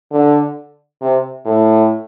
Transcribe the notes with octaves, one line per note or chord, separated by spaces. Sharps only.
D3
C3
A2